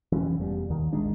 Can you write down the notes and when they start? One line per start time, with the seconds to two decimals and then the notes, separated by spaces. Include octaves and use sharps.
0.12 F1 E3 F3 C#4
0.38 F1 E2 B2 G3
0.70 D#2 D#3
0.93 A1 D#3 G#3 D4